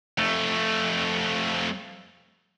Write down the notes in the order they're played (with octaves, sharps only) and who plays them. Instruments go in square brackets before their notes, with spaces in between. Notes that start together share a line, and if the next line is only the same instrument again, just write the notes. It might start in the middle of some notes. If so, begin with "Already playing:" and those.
[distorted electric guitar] F2 A3